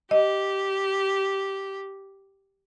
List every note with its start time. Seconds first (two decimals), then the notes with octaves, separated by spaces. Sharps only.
0.11 G4 D#5